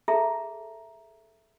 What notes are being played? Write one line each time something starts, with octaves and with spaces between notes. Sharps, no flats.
G#4 A4 E5 A5 A#5